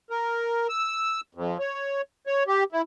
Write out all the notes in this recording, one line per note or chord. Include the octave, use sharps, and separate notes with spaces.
A#4
E6
F2
C#5
C#5
G4
E4